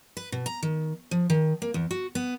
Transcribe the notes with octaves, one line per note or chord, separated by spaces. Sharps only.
B4
B2
A#5
D#3
F3
D#3
A#3
E2
F#4
B3